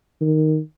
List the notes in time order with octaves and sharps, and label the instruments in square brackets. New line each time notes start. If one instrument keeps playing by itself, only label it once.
[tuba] D#3